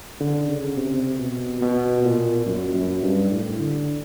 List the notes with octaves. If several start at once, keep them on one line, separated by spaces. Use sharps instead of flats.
D3
C#3
C3
B2
B2
A#2
F#2
F#2
G2
A2
D3